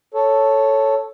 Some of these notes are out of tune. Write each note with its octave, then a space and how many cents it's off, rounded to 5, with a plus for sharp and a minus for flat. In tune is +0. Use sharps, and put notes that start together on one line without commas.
A4 +0 C#5 +0